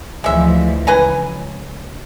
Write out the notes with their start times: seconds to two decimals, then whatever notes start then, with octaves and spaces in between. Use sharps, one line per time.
0.24 D2 E3 F3 G#3 E5
0.87 C#2 B4 G#5 A#5